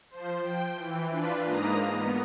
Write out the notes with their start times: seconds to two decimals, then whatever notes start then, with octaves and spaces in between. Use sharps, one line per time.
0.10 F3 C5
0.42 G5
0.74 E3
1.10 D4 F4 B4
1.44 G#2 A#3 A#5 D#6
1.90 B3